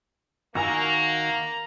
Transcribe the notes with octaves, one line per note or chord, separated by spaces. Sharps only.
D#3 A#3 F#4 G#5 A#5 E6